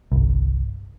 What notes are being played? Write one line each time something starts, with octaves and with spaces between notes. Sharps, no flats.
G1 C2